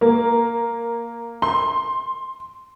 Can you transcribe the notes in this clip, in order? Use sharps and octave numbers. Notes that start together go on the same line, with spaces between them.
A#3
C6